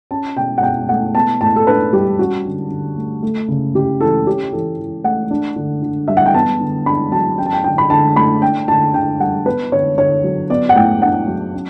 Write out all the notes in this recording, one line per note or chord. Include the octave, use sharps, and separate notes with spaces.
C#4 A5
B2 G5
F#5
B2 G5
A3 F#5
B3 A5
A2 A5
A4
D4 B4
G3 G4
C#4 F#4
D3
D3
A3
A3
C#3
C#3 G4
E3 A4
C#4 G4
E3 A4
E3
A3 F#5
D4
D3
D3
G3 E5
F#5
G5
B3 A5
D3
D4 B5
F#3 A5
C#4 G5
A5
G5
D3 G5
B5
D3 A5
A3 B5
D4 G5
D3 A5
D3 G5
G3 F#5
B3 B4
D3 C#5
D3 C#5
F#3
B3 D5
F#5
A2 G5
D4 F#5
F#3
C#4